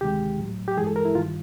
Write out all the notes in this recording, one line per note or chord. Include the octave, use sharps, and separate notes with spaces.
D2 C3 D#3 G#3 G4
A2 F#3
G4
G2 E3 G#3 G#4
A4
A#4
E4
G2 D#3 G3 F4